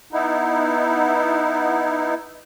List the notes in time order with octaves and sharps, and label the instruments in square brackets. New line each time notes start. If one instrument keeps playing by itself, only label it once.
[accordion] B3 D#4 E4